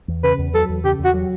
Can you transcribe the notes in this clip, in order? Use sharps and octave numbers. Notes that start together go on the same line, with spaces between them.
E2
C#3 B4
E2
F#3 A4
E2
C#3 G4
E2 F#4
F#3